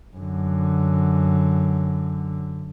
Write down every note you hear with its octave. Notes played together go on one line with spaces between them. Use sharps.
F#2 D3